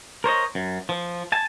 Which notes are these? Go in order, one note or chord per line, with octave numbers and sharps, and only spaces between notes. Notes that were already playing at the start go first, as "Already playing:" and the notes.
A#4 C5 C#5 D#5
F#2
F3
G#5 A5